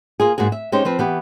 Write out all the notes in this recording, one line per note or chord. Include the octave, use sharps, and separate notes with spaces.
A#3 F4 G#4
G#2 A#3 F#4 G#4
E5
G#3 C#4 D#4 G4 C5
F3 C4 B4
E3 B3 G4